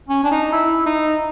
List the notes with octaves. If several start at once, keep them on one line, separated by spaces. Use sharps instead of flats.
C#4
D4
D#4
E4
D#4